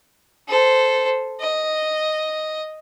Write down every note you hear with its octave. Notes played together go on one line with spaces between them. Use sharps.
A4 C5
D#5